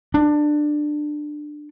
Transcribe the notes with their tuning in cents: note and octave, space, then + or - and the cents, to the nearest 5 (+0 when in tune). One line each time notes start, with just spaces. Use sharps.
D4 +20